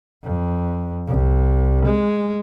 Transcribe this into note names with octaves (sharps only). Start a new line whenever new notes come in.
F2
C2
G#3